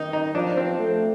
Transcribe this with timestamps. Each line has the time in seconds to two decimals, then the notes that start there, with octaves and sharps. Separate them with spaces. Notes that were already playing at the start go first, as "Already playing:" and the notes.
Already playing: D#3 D#4
0.13 D#4
0.35 F3 D4
0.57 C4
0.79 A3